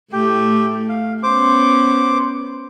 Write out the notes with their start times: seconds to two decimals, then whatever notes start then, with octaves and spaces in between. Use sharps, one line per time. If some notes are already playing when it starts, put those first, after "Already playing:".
0.13 A2 A3 G4 G5
0.89 F5
1.23 B3 C#4 C5 D6